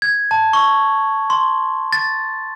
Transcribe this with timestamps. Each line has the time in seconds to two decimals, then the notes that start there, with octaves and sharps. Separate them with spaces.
0.02 G#6
0.31 A5
0.53 C#6
1.30 C6
1.93 A6